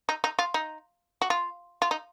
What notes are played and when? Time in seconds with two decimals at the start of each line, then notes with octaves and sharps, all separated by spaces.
0.09 D#4
0.24 D#4
0.39 F4
0.54 D#4
1.22 F#4
1.30 F4
1.82 F4
1.91 D#4